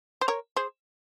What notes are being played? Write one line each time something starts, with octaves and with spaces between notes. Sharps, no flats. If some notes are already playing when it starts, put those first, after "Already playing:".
C5
A#4 C#5
G#4 C5